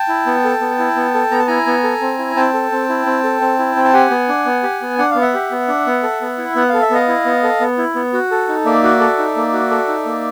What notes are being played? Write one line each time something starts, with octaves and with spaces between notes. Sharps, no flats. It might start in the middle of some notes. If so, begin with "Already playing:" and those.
Already playing: G5 A5
E4
B3
A4
B3
E4
B3
A4
B3 A#5
A5
E4 G#5 A#5
B3
A4
C4
E4
C4 G5 A5
A4
C4
E4
C4
A4
C4
E4
C4
A5
G4 F#5 G#5
B3
D4
B3
G4
B3
D4 F#5
B3 F5
E5 F#5
G4
B3
D4
B3
A4
B3
E4
B3 F#5
A4 F5
E5
B3 D#5 F5
E4
B3
A4
B3
E4
B3
F#4
A4
D#4
A#3 D5 E5
F#4
A4
D#4
A#3
F#4
A4
D#4
A#3